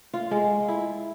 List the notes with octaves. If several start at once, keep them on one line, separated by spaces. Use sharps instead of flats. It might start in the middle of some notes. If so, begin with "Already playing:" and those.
F4
G#3
E4